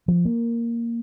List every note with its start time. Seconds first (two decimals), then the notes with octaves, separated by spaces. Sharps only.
0.08 F3
0.25 A#3